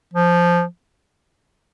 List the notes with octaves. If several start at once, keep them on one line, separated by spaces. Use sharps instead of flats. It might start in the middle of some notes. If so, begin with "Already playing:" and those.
F3